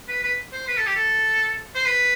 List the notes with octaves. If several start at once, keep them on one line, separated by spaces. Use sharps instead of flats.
B4
B4
C5
B4
A4
G4
A4
C5
B4